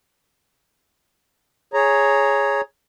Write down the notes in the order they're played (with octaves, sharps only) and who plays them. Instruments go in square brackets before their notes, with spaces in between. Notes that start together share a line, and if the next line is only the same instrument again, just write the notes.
[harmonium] G#4 C#5 A#5